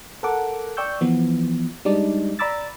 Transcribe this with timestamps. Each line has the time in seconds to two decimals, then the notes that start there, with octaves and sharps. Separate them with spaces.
0.23 A4 A#4 F#5 D6
0.77 D5 G5 C#6 E6 G6
1.01 E3 F3 B3
1.85 G3 G#3 D4 D#4 D5
2.39 D5 A#5 B5 D6 E6 A6